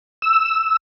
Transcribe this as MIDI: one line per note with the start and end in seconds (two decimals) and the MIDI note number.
0.22 0.76 88